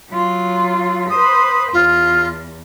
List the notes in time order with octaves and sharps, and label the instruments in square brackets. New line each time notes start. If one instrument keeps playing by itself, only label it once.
[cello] F#3 F4
[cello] B4 C5 [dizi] D#6
[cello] E2 [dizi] F4